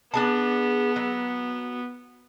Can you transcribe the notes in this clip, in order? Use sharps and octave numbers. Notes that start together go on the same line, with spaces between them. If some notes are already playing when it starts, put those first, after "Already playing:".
B3 D4 G#4 A5
F#3